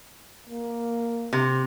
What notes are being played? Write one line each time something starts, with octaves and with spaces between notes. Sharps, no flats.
A#3
C3